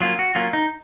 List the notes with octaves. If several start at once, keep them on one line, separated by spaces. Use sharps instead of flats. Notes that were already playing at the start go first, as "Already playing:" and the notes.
F#3 A#3 C#4 F4
F#4
F#3 A#3 C#4 F4
D#4